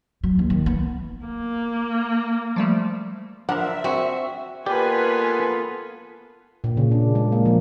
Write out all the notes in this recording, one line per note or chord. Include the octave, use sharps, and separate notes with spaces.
F#3
D#2
D#3
B3
A#3
F3 G3 A3
F3 D4 A#4 E5 F#5
F3 A#3 C4 F#4 G#4
A#3 B3 F4 G4 A4 B4 D5 G#5
A#2
C#3
D4
G#3
A#3
F3